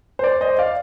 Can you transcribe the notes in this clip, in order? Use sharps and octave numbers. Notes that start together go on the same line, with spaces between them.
C5
D5
C5 D#5
D5 F5